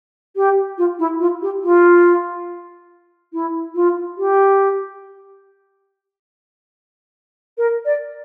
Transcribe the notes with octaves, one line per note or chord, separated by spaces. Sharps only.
G4
F4
E4
F4
G4
F4
E4
F4
G4
A#4
D5